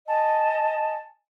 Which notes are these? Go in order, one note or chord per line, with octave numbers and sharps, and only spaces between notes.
D#5 G#5 A5